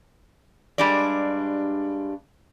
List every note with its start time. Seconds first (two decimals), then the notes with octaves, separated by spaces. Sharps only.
0.78 G2 G3 G#3 D4 D5